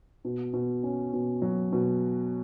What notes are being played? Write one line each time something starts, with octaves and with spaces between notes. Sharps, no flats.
B2
B2
C#4
B2
F#3
B2